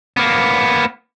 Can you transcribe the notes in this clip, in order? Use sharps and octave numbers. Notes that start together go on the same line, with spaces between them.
A#3 B3